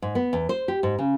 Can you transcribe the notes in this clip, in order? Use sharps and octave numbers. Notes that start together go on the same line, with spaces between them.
G#2
B3
E2
C5
G4
G#2
C#3